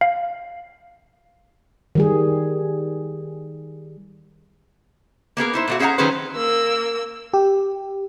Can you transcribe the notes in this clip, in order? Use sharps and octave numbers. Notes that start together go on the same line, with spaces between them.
F5
D#3 G3 G#4
A#3 B3 G#4 A#4
D#4 E4 C5
A#2 A3 F#4
C#4 G#4 C5 E5 F#5 A#5
D#3 F#3 C#4 G#4 B4 C5
A#3 E6
G4